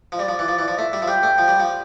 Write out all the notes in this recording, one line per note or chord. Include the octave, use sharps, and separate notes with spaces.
F3
G3 D5
F3
E3
F3
E3
F3
A3 E5
G3
F3
G3 G5
A3
F3
G3
F3